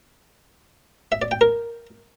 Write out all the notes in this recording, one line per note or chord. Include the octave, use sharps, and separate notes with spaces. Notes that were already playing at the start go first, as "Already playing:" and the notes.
E5
D5
G5
A#4